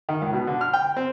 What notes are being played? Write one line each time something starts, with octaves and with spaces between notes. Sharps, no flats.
D#3
C#2
B2
D3
F6
G5
C4